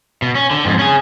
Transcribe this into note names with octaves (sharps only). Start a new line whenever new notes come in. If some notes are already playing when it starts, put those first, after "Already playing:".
B2
C#4
D3
F2 G#2
C#4 G#4